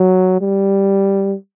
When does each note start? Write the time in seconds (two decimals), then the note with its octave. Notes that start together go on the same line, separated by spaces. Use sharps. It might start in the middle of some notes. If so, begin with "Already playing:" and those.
Already playing: F#3
0.41 G3